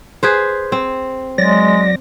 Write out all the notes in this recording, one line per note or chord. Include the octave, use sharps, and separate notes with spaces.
G#4 B4 C5
C4
F#3 G#3 D5 A#6